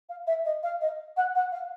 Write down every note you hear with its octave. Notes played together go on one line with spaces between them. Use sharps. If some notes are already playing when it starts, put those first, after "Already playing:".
F5
E5
D#5
F5
D#5
F#5
F#5
F5